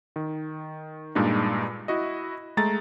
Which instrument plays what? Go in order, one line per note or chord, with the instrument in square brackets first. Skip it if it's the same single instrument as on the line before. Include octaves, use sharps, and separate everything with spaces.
[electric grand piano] D#3
G2 A#2 G#3 D4 D#4
E4 F#4 D#5
G#3 A3 A#5 A6